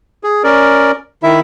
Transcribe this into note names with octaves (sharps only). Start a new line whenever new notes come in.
G#4
C#4 A#4 D5
D#3 E4 E5